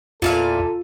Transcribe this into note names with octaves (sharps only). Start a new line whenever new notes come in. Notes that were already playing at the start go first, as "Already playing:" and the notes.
E2 A#2 E3 F4 A4 F5